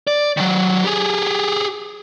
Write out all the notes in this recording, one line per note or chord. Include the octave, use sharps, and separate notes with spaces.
D5
D#3 F#3
G4 G#4